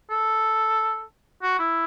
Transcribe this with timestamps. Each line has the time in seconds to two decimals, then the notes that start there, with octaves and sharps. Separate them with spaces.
0.10 A4
1.43 F#4
1.59 E4